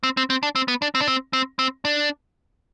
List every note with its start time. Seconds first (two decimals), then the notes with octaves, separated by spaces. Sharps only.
0.03 C4
0.17 C4
0.30 C4
0.43 D4
0.56 C4
0.68 B3
0.82 D4
0.95 C4
1.01 D4
1.08 C4
1.33 C4
1.59 C4
1.85 D4